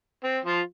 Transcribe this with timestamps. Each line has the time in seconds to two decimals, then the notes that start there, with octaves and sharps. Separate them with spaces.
0.24 C4
0.45 F3 F4